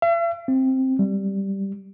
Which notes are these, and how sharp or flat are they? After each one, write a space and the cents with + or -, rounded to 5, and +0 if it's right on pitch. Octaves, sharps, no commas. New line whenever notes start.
E5 +45
C4 +5
G3 -5